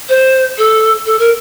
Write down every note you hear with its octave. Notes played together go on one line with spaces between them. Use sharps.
C5
A4
A4
A#4